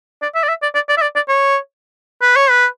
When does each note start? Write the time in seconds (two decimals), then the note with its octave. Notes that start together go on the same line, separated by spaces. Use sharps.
0.22 D5
0.35 E5
0.43 D5
0.49 E5
0.62 D5
0.75 D5
0.89 D5
0.98 E5
1.02 D5
1.16 D5
1.28 C#5
2.22 B4
2.36 C#5
2.50 B4